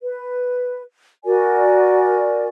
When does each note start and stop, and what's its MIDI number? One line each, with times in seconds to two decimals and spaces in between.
0.02 0.83 71
1.25 2.47 66
1.25 2.47 70
1.25 2.47 74
1.25 2.47 80